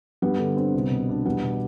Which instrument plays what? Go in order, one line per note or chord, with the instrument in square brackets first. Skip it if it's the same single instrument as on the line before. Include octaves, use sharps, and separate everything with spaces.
[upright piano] G2 [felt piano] G3 B3
[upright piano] D3
C4
C2
B2
D4
[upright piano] E2 [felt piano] G3 B3
[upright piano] B2